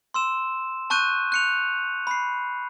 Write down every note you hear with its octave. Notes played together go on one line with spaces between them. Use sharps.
C6 E6 E7
A5 C#6 F#6 G6 D#7
F#6 C#7 F7
B5 C7